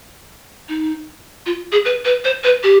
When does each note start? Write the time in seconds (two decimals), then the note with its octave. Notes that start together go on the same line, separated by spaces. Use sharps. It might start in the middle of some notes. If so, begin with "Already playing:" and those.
0.69 D#4
1.46 F4
1.72 G#4
1.85 B4
2.05 B4
2.24 C5
2.44 B4
2.63 G4